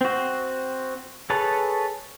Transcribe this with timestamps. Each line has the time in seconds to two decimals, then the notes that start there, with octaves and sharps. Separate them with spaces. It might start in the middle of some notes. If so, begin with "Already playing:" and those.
0.01 C4 F#4
1.30 G#4 A4 B4 C#5 A5